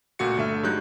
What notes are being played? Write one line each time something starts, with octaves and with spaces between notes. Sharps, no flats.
C#2 A#2 A3 F#4 C#7
G1 D3 A3 E5 C#6 F6
G2 F#3 G#3 D#4 F#6 G6